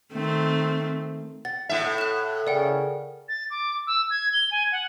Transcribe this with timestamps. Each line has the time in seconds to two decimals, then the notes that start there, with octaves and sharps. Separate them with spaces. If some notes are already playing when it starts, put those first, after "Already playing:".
0.13 D#3 A3 C4
1.45 F#5 A6
1.69 A2 E5
1.82 A4 F#5
1.98 F#6 E7
2.47 C#3 A#4 D5 F#5 G5
3.29 A6
3.50 D6
3.87 E6
4.10 G#6
4.33 G7
4.51 G#5
4.72 F#5